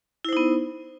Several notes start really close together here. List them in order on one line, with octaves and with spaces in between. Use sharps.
E4 C5 D#4 B3